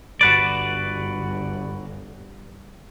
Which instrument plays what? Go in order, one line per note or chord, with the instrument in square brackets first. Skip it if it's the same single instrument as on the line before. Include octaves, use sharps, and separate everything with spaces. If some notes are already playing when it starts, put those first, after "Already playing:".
[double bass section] G1 [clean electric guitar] F#4 B4 D5